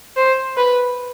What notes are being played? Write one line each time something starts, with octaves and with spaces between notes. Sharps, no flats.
C5
B4